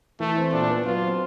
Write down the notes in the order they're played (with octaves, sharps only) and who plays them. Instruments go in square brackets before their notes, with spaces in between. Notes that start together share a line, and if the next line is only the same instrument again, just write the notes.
[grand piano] E3 [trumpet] A3
[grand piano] C4
[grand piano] A#2 [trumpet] D4
[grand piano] B3
[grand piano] F#3 [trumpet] F4
[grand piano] C4